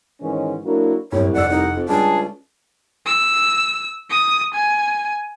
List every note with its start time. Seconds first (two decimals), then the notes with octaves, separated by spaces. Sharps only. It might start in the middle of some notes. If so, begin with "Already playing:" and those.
0.21 G#2 D#3 E3 G#3 C#4
0.65 F#3 A#3 D4 E4 F#4 A#4
1.12 C2 F#2 A2 C#5
1.34 F1 D5 F#5 E6
1.50 C2 D#4
1.76 F2
1.89 C#2 G3 D4 G#4 A5
3.06 E6
4.10 D#6
4.54 G#5